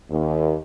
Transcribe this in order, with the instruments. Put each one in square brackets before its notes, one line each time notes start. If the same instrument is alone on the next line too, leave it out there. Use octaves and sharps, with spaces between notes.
[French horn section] D#2